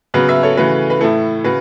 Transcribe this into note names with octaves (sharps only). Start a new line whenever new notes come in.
C#3 F#3 B3 F#4 B4
B4 E5
A4 C#5
C#3 E3 A3 F#4 B4
B4
A2 A3 E4 A4
C#3 F#4 B4